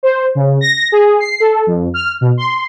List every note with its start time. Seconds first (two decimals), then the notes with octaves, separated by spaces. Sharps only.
0.03 C5
0.35 C#3
0.61 A#6
0.92 G#4
1.20 C7
1.40 A4
1.67 F2
1.94 F6
2.21 B2
2.38 C6